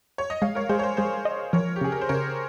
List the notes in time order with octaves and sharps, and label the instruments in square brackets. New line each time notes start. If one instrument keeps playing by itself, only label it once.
[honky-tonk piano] C#5
D#5
[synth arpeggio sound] G#3 [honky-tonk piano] C#5 F5
[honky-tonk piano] A#4 C#5
[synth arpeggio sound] G#3 [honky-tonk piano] G#4 C5
[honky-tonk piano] C#5
G#4 C5
[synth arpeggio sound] G#3 [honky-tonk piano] G#4 C5
[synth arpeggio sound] D#5
[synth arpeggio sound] F3 [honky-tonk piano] A#4 C#5
[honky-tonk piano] G4
[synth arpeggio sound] C#3 [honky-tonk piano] G#4
[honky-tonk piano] A#4
C5
[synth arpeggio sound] C#3 [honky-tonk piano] A#4 C#5